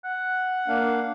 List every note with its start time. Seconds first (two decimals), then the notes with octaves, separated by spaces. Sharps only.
0.04 F#5
0.68 A#3 D4 F5